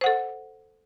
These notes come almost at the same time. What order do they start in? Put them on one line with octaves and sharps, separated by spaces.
C5 F#5 A4